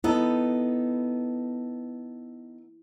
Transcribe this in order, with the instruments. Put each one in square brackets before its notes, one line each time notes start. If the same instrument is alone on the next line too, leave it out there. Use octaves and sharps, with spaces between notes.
[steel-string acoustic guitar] B3 D#4 A4 [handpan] E4